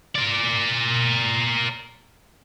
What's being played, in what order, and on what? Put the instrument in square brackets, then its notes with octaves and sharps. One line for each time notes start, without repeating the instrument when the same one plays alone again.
[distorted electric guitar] A#4 D5